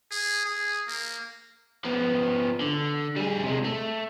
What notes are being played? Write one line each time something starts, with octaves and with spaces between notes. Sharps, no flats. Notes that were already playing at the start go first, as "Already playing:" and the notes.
G#4
G#4
A#3
F3 B3
D3
G3 G#4
C3 G#3
A3